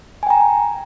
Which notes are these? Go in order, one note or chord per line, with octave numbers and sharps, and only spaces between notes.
G5 G#5 A#5